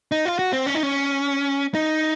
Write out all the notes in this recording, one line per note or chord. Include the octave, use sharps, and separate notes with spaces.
D#4
F4
F#4
C4
C#4
D#4
C#4
D#4